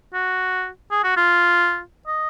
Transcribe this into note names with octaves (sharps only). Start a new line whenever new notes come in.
F#4
G#4
F#4
F4
D#5